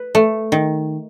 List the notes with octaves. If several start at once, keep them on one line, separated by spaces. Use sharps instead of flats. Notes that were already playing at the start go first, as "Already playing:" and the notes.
Already playing: B4
A3
D#3